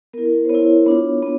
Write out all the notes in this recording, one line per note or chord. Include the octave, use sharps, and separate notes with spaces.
B3 E4 A#4
A#4
C5
B3 C#5
E4
B3 D4 F4
B3